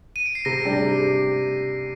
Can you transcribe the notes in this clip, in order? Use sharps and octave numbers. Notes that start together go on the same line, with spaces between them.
D#7
D7
C7
C3 A#6
G3 D4 G4
C3